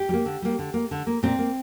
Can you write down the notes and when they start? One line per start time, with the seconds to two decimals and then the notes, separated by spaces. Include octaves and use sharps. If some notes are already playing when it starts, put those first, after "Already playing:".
Already playing: G4
0.09 G3
0.13 A#3
0.25 D3
0.42 G3 A#3
0.59 D3
0.74 A#3
0.91 D3
1.07 A#3
1.23 A#2 C4
1.39 A#3